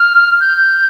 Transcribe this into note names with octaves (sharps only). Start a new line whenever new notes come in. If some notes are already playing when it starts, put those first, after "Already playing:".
Already playing: F6
G6